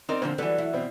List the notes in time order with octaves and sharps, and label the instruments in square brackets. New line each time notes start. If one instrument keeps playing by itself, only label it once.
[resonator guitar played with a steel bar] C4 A#4 [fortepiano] D#4 D5
[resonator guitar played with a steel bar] A#2 D3 F3 [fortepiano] C4
[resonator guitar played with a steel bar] E3 F#3 [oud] G3 B4 [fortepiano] A4
[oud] E4
[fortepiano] B2 C4